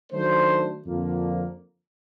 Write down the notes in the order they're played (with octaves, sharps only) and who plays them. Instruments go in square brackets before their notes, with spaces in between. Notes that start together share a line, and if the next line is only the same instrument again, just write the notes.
[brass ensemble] D#3 F#3 A3 D4 C5
F2 D3 F3 A#3